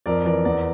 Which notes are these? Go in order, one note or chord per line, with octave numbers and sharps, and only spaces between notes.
F2 A#4 D5
E3 A#4 D5
E2 A#4 D5